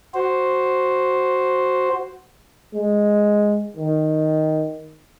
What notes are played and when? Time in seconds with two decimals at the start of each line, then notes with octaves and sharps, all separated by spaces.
0.14 F#4 C5
2.74 G#3
3.77 D#3